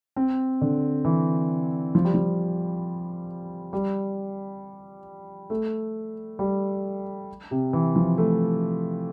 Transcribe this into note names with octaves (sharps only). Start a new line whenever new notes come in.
C4
D3
E3
F3
G3
F3
G3
A3
G3
C3
E3
F3
A3